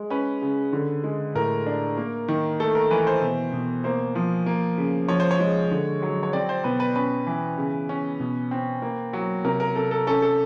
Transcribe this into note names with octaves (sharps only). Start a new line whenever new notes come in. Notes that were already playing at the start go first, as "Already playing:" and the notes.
Already playing: G#3
C#4 B4
C#3
D3
G#3
A2 A#4
D4
A#3
D#3
A3 A4
A#4
E3 B4
C5
B2
B2
A#3 C5
F3
A#3
C#3
F3 C#5
C5
C#5
G#3
D3
F#3
C#5
C4 D5
C5
B2 B4
B4
C#4 B4
E3
C#3
C#4
B2
C4
A#3
F#3
C3 A#4
A#4
C3 A4
A4
C#4 A4
A4